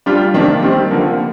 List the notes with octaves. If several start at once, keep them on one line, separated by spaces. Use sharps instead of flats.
G3 D4 F4
C3 D#3 A#3 D4
D#3 G3 C4
D3 F3 A#3